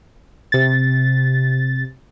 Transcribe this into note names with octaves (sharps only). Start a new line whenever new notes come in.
C3 A6